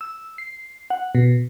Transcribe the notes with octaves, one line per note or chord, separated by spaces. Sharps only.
E6
C7
F#5
B2